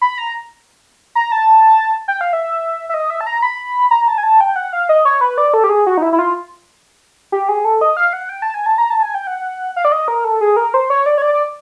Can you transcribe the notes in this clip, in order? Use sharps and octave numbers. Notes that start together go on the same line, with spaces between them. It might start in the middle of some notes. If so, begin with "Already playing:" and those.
B5
A#5
A#5
A5
G5
F5
E5
E5
D#5
E5
A5
A#5
B5
A#5
A5
G#5
A5
G5
F#5
F5
D#5
C#5
B4
D5
A4
G4
G#4
F#4
D#4
E4
E4
F4
G4
G#4
A4
D#5
F5
F#5
G5
A5
G#5
A5
A#5
A5
G#5
G5
F#5
F5
D5
D#5
A#4
A4
G#4
A#4
C5
C#5
D5
C#5
D5